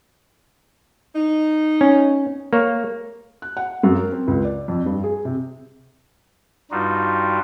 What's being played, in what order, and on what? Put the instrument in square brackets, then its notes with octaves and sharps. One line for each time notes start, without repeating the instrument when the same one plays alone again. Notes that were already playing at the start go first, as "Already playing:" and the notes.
[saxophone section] D#4
[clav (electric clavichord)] C#4
A#3 C#5
[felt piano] F#6
F#5
F#2
A#4
C4
C#2
D5
F2
G2
G#4
C3
[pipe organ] G2 G3 D#4 F4 F#4